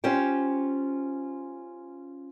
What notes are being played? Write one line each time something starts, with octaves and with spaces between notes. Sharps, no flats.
C#4 F4 G4 C5 G5